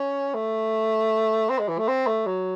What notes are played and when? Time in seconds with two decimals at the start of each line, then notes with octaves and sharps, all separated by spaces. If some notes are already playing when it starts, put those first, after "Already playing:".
Already playing: C#4
0.34 A3
1.50 C4
1.59 G#3
1.68 E3
1.78 A3
1.88 C4
2.07 A3
2.26 F#3